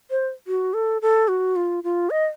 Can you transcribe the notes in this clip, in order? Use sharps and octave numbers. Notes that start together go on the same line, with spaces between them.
C5
F#4
A4
A4
F#4
F4
F4
D#5